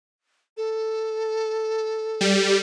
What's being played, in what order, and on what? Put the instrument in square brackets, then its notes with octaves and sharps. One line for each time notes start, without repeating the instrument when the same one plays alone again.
[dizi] A4
[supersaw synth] G3